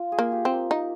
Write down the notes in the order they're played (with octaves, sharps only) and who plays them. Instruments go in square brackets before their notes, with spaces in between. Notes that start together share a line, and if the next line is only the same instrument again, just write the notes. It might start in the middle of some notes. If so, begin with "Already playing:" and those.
Already playing: [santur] F4
G#4
[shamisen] A#3
[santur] G4
[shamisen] C4
[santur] A#3
[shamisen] D#4